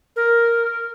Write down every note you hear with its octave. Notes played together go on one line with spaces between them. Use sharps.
A#4